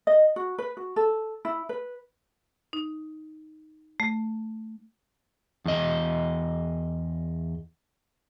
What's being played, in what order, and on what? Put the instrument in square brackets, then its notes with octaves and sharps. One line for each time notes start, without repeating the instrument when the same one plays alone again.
[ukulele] D#5
F#4
B4
F#4
A4
E4
B4
[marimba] D#4
A3
[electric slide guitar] E2 D#5